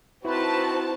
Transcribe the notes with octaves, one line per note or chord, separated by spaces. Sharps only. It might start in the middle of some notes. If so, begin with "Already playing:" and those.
C4 D#4 E4 F#4 B4 A5